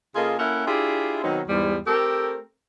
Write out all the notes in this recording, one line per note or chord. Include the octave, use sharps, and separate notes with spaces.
C#3 A#3 F4 G#4 A4 D#5
A#3 C#4 E4 A4 A#4 F#5
D4 E4 F4 G4 G#4 E5
B2 D#3 F#3 C4 D#4
E2 G#2 G3
A3 C4 G4 A4 A#4